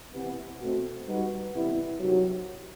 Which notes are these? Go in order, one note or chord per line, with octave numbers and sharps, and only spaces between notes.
C3 E3 B3
B2 A3 C4
G3 D#4 F#4 B4
C3 E3 G3 B3 E4
C3 D#3 F#3